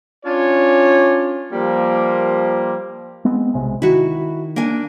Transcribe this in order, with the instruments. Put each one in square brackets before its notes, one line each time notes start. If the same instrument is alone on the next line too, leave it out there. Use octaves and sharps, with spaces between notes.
[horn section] C#4 D4 F4 C#5
F3 G3 A#3
[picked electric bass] G#3 B3 C4
B1 C3 G#3
[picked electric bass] D#3 [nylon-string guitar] E4 F#4
[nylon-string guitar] A#3 D4 G#5